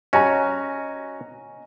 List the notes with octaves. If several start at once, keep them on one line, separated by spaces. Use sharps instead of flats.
C#4 F#4 D#5 G#5 A#5